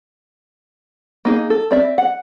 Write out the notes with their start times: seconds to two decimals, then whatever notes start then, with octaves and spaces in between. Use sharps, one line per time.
1.25 A#3 D#4 G#4
1.50 A4
1.71 C4 D5 E5
1.98 F#5